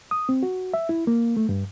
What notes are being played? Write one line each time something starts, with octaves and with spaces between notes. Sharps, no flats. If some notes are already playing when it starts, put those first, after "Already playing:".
D#6
C4
F#4
E5
E4
A#3
A3
G2